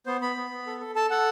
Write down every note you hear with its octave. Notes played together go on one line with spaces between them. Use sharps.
B3 C5
B3 B5
B3
B3
A4
A4
A4 A5
A4 F#5